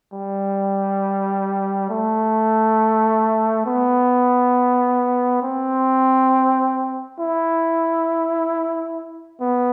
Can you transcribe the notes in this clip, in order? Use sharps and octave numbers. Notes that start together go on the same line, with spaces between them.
G3
A3
B3
C4
E4
B3